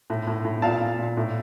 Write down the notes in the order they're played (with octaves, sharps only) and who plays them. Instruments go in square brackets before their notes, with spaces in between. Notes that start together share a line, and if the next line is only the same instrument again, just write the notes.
[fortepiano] A2
A2
A2
A#2 F5 A5
A#2
A#2
A2